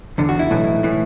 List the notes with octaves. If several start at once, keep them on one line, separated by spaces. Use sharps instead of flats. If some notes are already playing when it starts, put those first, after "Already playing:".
E2 D3
F#4
E4
B1 A2 E3
A2 E3